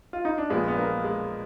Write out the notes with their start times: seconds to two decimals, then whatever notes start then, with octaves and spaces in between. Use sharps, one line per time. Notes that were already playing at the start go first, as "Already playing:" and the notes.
0.13 F4
0.25 D#4
0.38 D4
0.50 A#1 A#2 F3 G#3 B3
0.68 B3
0.77 A#3
1.04 G#3